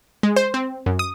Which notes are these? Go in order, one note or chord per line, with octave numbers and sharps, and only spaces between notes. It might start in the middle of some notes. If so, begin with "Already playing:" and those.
G#3
C5
C4
F#2
D#6